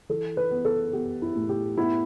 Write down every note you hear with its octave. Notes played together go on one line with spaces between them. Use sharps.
E3 A4
B4
B3
A4
B3 G4
E4
A2
G4
B3 E4